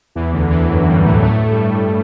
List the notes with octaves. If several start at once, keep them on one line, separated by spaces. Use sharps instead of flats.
E2 E3
D2 D3
E2 E3
F#2 F#3
G2 G3
A2 A3
A2 A3
G2 G3